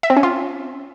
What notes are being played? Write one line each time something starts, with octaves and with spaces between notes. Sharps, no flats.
E5
C4
C#4
F4